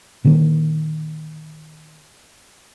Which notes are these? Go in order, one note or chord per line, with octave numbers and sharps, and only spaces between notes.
A#2 D3 D#3 A#3